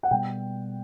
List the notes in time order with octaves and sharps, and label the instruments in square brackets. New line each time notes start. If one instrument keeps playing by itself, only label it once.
[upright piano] F#5
[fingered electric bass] B2 G3 B3 [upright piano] G5